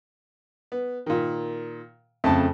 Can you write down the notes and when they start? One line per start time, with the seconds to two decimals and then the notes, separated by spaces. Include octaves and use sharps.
0.72 B3
1.06 A#2 D#3
2.24 F2 C#3 A3 A5